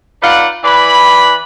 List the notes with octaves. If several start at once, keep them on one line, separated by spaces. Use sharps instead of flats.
D#4 F4 B4 D5 F#5
E3 B4 D5 B5